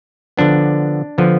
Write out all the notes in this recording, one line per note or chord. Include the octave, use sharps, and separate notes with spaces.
D3 F3 B3 D4
D3 F3 B3